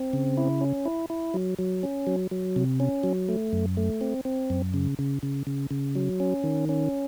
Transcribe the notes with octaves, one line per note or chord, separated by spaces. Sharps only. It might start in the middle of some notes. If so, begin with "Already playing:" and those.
Already playing: C4
C#3
E4
C#4
E4
E4
F#3
F#3
C#4
F#3
F#3
C3
C#4
F#3
A3
F#2
A3
C4
C4
F#2
C#3
C#3
C#3
C#3
C#3
F#3
C#4
D#3
C#4